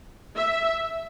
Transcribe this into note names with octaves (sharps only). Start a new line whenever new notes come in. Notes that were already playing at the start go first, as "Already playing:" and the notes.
E5